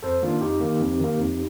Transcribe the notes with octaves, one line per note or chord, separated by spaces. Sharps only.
F2 A4 C5
D#3 A#3 D4 F4
F2 D#4 G4
D#3 A#3
F2
D#3 A#3
F2